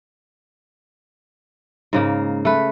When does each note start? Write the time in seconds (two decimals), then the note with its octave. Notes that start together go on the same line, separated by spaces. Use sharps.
1.93 G#2 C#3 A#3
2.45 A3 B4